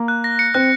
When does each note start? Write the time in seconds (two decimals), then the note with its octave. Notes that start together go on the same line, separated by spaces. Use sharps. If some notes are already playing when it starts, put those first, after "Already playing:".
Already playing: A#3
0.08 F#6
0.24 A#6
0.39 C#7
0.54 C4 F#6